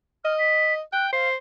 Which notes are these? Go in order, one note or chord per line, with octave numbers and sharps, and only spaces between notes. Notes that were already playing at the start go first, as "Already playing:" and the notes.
D#5 F6
B6
G5 F#6
C5 F5